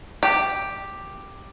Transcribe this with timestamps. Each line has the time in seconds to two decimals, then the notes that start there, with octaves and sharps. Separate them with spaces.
0.23 G4